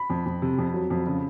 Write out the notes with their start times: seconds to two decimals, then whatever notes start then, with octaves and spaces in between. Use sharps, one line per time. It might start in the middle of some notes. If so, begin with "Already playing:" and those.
Already playing: B5
0.10 F2
0.26 F2
0.42 C3
0.58 F2
0.74 F#3
0.90 F2
1.07 C#3